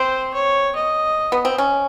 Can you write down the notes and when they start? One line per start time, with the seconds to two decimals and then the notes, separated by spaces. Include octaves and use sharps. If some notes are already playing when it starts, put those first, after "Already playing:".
Already playing: C4 C5
0.34 C#5
0.75 D#5
1.32 B3
1.45 C4
1.58 C#4